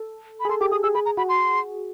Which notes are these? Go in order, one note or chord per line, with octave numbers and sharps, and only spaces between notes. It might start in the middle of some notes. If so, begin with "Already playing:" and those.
Already playing: A4
B5
G#4
A4 C6
G4 D6
G#4 D#6
G#4 E6
G#4 B5
A#5
F#4 B5
C6